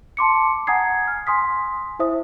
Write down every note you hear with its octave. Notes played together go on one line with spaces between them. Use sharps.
A5 C6 D6 C#7
F#5 G#5 A#5 D#6 G#6 C7
F6
G#5 C6 D#6 B6
E4 C5 E5 D#6